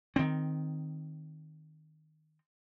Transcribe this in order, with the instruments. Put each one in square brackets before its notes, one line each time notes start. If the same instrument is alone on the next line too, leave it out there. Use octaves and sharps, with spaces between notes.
[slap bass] D#3 C4